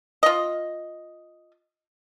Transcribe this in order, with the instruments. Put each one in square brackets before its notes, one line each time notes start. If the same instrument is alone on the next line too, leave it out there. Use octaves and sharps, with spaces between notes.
[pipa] F4 D#5